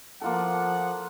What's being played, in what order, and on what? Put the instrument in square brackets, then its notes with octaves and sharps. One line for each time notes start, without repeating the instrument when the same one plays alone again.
[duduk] F3 [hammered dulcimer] A#3 F4 A4 [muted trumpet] F#5